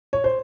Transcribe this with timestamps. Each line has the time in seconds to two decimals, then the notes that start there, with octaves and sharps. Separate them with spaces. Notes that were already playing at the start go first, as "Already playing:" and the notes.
0.13 C#5
0.24 C5